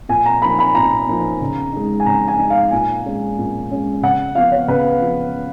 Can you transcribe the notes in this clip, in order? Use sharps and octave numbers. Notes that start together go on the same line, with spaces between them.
A#2 G#5
A#5
F3 A#3 D#4 B5
B5
A#2 A#5
F3 A#3 D#4
C#3
G#3 D#4
G#5
C#3 A#5
G#5
G#3 D#4
F5
A#2 G#5
G#3 C#4
A#2
G#3 C#4
C#3 F#5
F3 B3 F5
C#5
C#3 B4
F3 B3